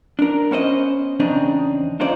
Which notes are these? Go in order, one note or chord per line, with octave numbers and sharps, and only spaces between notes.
D4 A#4
B3 C#4 C5 D#5
E2 C#3 C4 D4 D#4
D4 D#4 F4 C5 D5